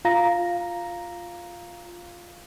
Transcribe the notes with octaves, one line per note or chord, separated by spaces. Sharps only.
F4 F5 A#5 A#6